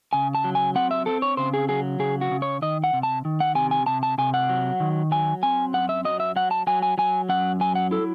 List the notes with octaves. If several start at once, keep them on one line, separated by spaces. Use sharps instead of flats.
C#3 G#5
A5
F#3
G#5
C4 F#5
E5
C4 A4
C#5
C#3 C5
G#4
F#3 G#4
C#3 G#4
F#4
C#3
C#5
D#3 D#5
F#5
C3
A5
D#3
F#5
C3 G#5
G#5
C3 A5
A5
C3 G#5
F#5
F#3
D#3
F#3 G#5
C4 G#5
F#2 F#5
E5
F#3 D#5
E5
F#3 F#5
A5
F#3 G#5
G#5
F#3 G#5
F#2 F#5
F#3 G#5
F#5
E4 A4